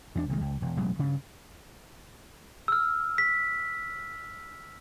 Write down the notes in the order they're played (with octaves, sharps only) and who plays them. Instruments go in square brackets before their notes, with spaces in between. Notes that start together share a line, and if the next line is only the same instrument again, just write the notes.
[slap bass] E2 A3 D4
C2 D#3 G#3
C#2
E1
E1 A1 F#3 G#3
G2 C#3
[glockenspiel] E6 F6
B6